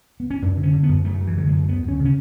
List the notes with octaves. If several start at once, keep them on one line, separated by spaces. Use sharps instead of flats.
B3
C#4
F#2 D4
D3
C#4
D3
B3
F#2
F#2 A3
F#2
E3
D3 F#3
G#3
F#2 A3
D2 B3
D2
C#4
C#3
C#4